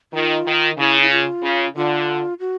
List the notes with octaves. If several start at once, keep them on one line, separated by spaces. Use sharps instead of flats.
D#3 F4
D#3
C#3 E4
E4
F4
C#3
D3 F4
F#4